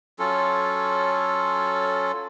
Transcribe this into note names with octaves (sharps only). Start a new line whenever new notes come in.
F#3 C#4 F4 A4